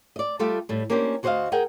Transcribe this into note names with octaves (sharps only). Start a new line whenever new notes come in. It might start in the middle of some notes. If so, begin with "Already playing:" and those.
D5 D#5
G3 A3 F4 G4 A4
A2 G3
A#3 C#4 D4 G4 C5
D2 F#4 C5 D5 D#5 F5
G#4 A#4 F#5 G5